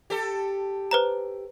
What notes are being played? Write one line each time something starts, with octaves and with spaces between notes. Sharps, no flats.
G4 A4
B4 C5 A#5